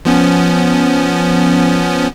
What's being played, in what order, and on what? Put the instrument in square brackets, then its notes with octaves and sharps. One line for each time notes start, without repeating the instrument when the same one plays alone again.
[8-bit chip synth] F3 B3 C#4